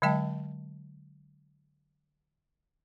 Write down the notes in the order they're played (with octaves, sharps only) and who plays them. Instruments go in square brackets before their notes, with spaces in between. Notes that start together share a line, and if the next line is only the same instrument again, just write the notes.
[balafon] D3 F#3 G#3 D#5 G5 A5